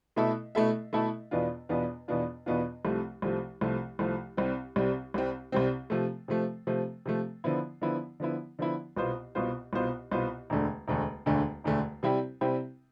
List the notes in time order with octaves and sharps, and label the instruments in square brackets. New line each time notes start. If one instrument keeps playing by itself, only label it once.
[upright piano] B2 A3 E4 A4 E5
B2 A3 E4 A4 E5
B2 A3 E4 A4 E5
E2 B2 B3 D4 F4
E2 B2 B3 D4 F4
E2 B2 B3 D4 F4
E2 B2 B3 D4 F4
C2 C3 F3 A3
C2 C3 F3 A3
C2 C3 F3 A3
C2 C3 F3 A3
C2 C3 G3 C4
C2 C3 G3 C4
C2 C3 G3 C4
C2 C3 G3 C4
C3 F3 A3
C3 F3 A3
C3 F3 A3
C3 F3 A3
D3 F3 B3 E4
D3 F3 B3 E4
D3 F3 B3 E4
D3 F3 B3 E4
C2 B2 B3 F4 C5
C2 B2 B3 F4 C5
C2 B2 B3 F4 C5
C2 B2 B3 F4 C5
E1 D2 D3 A3
E1 D2 D3 A3
E1 D2 D3 A3
E1 D2 D3 A3
C3 G3 C4 E4 G4
C3 G3 C4 E4 G4